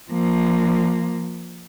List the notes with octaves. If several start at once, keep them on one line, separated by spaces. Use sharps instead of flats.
F3 A#3